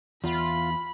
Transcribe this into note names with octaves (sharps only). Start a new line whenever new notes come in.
E2 F4 B5